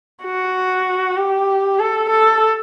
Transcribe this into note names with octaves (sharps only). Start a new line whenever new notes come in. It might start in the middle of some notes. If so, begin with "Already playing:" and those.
F#4
G4
A4
A4